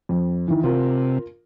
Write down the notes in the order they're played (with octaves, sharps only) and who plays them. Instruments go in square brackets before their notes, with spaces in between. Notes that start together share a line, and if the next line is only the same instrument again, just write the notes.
[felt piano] F2
D#3 E3
[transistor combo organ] C3 [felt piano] F4 A#4